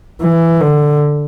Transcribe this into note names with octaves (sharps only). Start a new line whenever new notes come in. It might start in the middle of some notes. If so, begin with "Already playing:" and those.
E3
D3